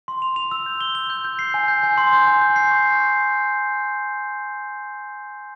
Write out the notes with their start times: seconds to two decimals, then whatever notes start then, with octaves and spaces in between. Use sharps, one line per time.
0.08 C6
0.22 F7
0.36 F7
0.51 E6
0.66 G6
0.81 G7
0.95 G7
1.10 G6
1.24 G6
1.39 C7
1.54 G#5
1.68 G6
1.83 G#5
1.98 C6
2.13 G6
2.27 G#5
2.41 G6
2.56 C7
2.71 C#6